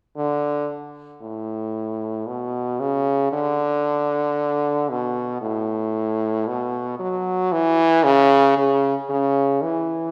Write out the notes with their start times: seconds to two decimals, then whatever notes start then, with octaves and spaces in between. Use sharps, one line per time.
0.17 D3
1.22 A2
2.28 B2
2.80 C#3
3.32 D3
4.90 B2
5.41 A2
6.47 B2
6.99 F#3
7.52 E3
8.04 C#3
8.57 C#3
9.09 C#3
9.62 E3